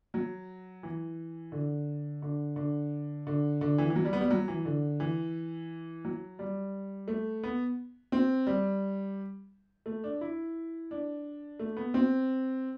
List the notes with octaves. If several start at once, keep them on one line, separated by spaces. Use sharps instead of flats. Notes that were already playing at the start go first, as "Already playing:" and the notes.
F#3
E3
D3
D3
D3
D3
D3
E3
E3
F#3
G3
B3
G3
F#3
E3
D3
E3
F#3
G3
A3
B3
C4
G3
A3
D4
E4
D4
A3
B3
C4